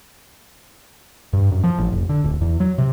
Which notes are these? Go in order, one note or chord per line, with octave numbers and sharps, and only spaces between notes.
G2
F#2
F3
A1
F1
D3
D1
E2
F#3
C3